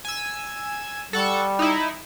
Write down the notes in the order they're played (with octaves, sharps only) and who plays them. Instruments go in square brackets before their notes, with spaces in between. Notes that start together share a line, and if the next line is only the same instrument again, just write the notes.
[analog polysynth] G#5 E6
[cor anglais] G3 [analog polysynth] A4 F#5 C#6
[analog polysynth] D#4 E4